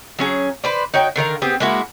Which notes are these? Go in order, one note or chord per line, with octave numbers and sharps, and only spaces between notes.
F#3 C#4 G#4
B4 C5 D5
D#4 F#4 C#5 G5
D3 D#3 A#4 F5
B3 C4 G4 G#4
G#3 A#3 E4 F#4